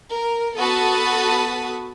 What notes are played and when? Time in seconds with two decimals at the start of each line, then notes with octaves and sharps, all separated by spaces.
0.14 A#4
0.56 B3 F#4 A4 A5 B5 D#6